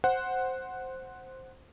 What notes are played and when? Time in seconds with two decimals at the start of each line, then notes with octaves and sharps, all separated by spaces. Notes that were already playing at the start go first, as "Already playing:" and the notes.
0.04 C5 F#5